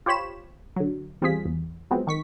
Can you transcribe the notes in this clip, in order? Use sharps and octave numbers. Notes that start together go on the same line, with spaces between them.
F4 G4 C5 C#5 B5 E7
D3 F#3
E2 G3 C4 F4 G#4 B6
E2
F3 F#3 G#3 B3 C4
D#3 C#6 B6